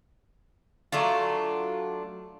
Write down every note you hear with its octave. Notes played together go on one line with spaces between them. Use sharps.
F#3 A3 D4 F4